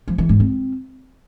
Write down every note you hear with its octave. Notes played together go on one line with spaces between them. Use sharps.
F3
E3
G#2
C4